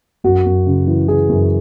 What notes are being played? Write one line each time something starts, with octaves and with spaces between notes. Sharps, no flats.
F#2 F#4
F#2
C#3
E3
E3 G#4
F#2